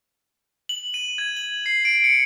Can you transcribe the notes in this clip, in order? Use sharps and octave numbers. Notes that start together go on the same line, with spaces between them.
F#7
D#7
G#6
F#7
C7
D7
C#7